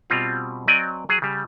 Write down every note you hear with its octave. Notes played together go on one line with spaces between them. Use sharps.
B2 G3 C4 F4
F#3 C4 D5 D#5 G#5
F#3 G#4
C#3 G3